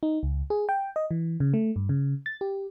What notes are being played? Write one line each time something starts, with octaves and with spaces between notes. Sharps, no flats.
D#4
C#2
G#4
G5
D#5
E3
C#3
A3
G2
C#3
A6
G4